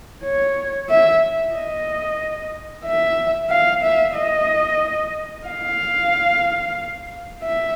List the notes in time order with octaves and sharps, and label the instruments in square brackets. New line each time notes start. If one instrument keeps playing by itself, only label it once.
[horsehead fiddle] C#5
E5
D#5
E5
F5
E5
D#5
F5
E5